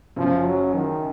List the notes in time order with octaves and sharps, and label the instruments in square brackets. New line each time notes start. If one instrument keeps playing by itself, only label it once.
[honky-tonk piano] F#1 F#2 C#3 [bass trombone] F3
[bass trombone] F#3
D#3